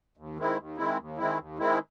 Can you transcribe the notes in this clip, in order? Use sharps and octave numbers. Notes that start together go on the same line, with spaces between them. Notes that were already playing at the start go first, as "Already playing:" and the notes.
D#2
D#3 G#3 C4 E4
D#2
D#3 G#3 C4 E4
D#2
D#3 G#3 C4 E4
D#2
D#3 G#3 C4 E4